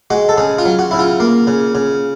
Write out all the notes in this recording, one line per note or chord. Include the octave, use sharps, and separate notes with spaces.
G#3 F#4
A4
C#3 G#4
F4
F#3
F#4
C#3 E4
F4
A#3
C#3
C#3